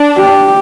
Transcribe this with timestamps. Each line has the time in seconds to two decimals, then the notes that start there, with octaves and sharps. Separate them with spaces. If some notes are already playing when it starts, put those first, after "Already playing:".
Already playing: D4
0.17 G4